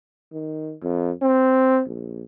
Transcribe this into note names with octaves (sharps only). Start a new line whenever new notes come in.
D#3
F2
C4
A#1